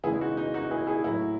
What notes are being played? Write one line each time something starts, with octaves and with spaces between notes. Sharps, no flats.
C#3 E3 G#3 E4 G#4
D#4 F#4
D#4
D#4 F#4
E4 G#4
E4 G#4
A2 F#3 E4